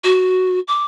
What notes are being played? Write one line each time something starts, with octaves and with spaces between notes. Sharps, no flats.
F#4
D6